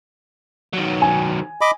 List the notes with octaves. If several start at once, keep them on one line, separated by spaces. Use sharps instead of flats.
D#3 F#3
G#5
D#5 B5 D6